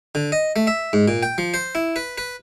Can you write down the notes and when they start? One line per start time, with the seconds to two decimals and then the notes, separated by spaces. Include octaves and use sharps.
0.15 D3
0.32 D#5
0.56 A3
0.67 E5
0.93 G#2
1.08 A#2
1.23 G5
1.38 F3
1.54 C5
1.75 E4
1.96 B4
2.18 B4